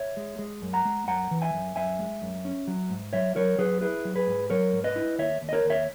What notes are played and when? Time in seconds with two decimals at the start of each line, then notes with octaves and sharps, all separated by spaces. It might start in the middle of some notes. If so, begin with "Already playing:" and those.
Already playing: C#5 E5
0.17 G#3
0.39 G#3
0.62 F#2
0.73 F#5 A#5
0.85 G#3
1.07 F#2 F#5 A#5
1.31 E3
1.42 E5 G#5
1.54 F#2
1.76 F#2 E5 G#5
1.99 G#3
2.22 F#2
2.45 C#4
2.68 F#3
2.90 G#2
3.13 F#3 C#5 E5
3.36 F#3 A#4 C#5
3.59 F#3 G#4 B4
3.81 E4 G#4 B4
4.05 F#3
4.16 G#4 B4
4.27 G#2
4.50 F#3 A#4 C#5
4.73 G#2
4.84 B4 D#5
4.96 E4
5.18 D#2 C#5 E5
5.42 D#2
5.49 D#5
5.53 A#4 C#5
5.65 D#2
5.70 C#5 E5